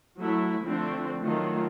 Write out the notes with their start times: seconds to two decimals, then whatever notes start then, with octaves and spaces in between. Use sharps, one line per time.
0.20 F#3 A3 E4
0.64 D3 F3 A3 C4 D4
1.23 D#3 F#3 A3 F4